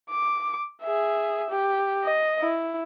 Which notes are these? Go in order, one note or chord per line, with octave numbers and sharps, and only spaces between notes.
D6
G#4 E5
G4
D#5
E4